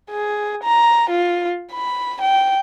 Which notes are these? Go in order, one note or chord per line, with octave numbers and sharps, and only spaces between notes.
G#4
A#5
F4
B5
G5